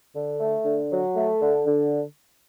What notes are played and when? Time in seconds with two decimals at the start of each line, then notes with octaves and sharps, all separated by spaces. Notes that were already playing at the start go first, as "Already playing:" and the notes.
0.15 D3
0.40 A3
0.65 D3
0.91 F#3
1.16 A3
1.41 D3
1.66 D3